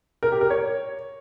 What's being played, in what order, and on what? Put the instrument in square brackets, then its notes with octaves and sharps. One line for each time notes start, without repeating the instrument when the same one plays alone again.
[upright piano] A#4
G4
A#4
C#5